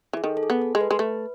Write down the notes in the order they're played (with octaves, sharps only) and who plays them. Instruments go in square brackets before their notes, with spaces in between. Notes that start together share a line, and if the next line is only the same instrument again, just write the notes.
[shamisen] E3 [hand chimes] G#4
[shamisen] D#3 [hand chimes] A4
[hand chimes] A4
G#4
[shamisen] B3
[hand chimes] A4
[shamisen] G#3
[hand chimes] B4
[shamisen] G#3
A3